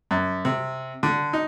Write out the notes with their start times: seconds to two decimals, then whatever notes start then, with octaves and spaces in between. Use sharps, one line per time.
0.11 F#2
0.45 C3
1.03 D3
1.33 D#4